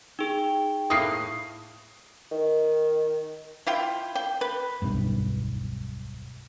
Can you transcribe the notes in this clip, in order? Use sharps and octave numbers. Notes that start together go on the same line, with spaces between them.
D#4 G#4 G5
A2 A#3 B4 D#6 C7
D#3
E4 F4 G5
G5
B4
D1 B1 G2